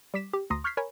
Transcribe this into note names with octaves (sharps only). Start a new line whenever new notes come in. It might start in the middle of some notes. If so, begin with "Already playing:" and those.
G3 D6 B6 E7
G4
D2 A#5 C6 D#6 A#6
C#6 F6 G6 G#6 B6 C7
A#4 C#5 G#5 B5